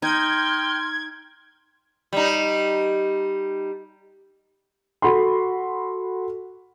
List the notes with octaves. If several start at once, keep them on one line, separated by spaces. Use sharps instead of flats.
D#4 G5 C6 F6 G#6
G3 D#4
F#4 A4 B5 C6